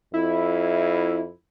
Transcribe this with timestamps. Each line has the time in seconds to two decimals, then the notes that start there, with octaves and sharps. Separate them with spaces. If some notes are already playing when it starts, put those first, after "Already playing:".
0.14 F2 E4